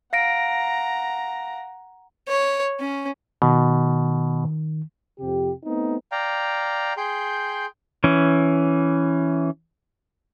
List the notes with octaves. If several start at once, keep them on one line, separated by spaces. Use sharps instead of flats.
F5 F#5 A#5 A#6 D7
C#5
C#4
B2 D#3
F2 C3 G4
A3 B3 C4 D#4
D5 F5 G5 A#5
G#4 G5 C6 G6
E3 C#4